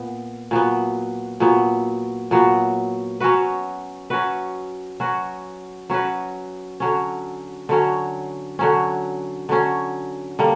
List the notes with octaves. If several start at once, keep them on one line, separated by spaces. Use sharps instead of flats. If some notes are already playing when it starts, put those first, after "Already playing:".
Already playing: A#2 B3
A#2 F#3 B3
A#2 F#3 B3
A#2 F#3 B3
F#3 C#4 F#4 B4
F#3 C#4 F#4 B4
F#3 C#4 F#4 B4
F#3 C#4 F#4 B4
D3 F#3 C#4
D3 F#3 C#4
D3 F#3 C#4
D3 F#3 C#4
D3 G3 A#3